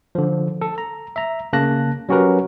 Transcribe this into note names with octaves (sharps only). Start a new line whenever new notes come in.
D3 F3
A4
A#5
E5 A#5
C#3 A#3 A5 F#6 A#6
F#3 C#4 F#4 G4 A#4 B4